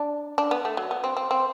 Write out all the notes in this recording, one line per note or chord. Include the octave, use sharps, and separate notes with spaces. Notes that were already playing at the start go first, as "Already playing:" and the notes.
Already playing: D4
D4
B3
A3
F#3
B3
C4
C4
C4